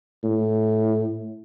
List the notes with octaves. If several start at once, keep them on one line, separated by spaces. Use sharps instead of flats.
A2